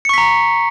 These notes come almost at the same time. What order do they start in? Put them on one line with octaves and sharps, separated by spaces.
C#7 C#6 B6 A#5